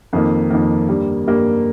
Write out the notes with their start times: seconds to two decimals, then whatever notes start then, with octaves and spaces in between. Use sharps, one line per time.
0.13 F2 D#3 A#3
0.50 F2 D#3 A#3
0.89 G2 G3 A#3
1.26 G2 G3 A#3